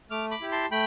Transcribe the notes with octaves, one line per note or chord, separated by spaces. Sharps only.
A3 D6 F6
B5 D6
E4 G4
A5 C6
A3 G5 B5